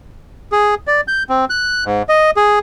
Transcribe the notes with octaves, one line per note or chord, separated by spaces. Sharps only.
G#4
D5
G6
C4
F#6
G#2
D#5
G#4